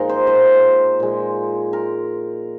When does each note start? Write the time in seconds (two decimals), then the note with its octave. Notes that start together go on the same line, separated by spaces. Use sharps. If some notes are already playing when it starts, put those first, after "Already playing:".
Already playing: A#2 F3 G#3 D#4 F4 A#4
0.09 C5
0.27 C5
1.00 A#2 G#3
1.73 A#4